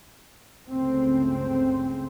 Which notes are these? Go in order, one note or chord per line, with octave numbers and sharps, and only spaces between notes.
G1 C#2 C#3 A3 C4